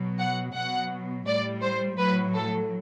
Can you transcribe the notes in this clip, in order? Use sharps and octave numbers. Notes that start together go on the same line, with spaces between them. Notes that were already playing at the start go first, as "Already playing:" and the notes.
Already playing: B2 F#3
F#5
B2 F#3 F#5
A2 G3 D5
C5
A2 F#3 B4
A4